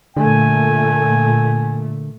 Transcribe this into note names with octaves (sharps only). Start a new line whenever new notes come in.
A#2 D3 A3 G#5